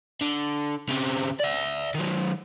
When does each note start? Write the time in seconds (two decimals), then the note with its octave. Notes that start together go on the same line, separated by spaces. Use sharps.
0.21 D3
0.89 C#3 C4
1.39 D5 E5
1.95 D#3 F#3